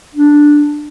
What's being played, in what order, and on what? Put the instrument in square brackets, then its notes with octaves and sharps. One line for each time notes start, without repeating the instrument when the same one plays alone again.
[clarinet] D4